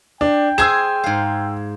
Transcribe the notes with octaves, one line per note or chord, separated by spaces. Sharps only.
D4 G5
G#4 C5 G#5 E6 G#6 E7
G#2 F5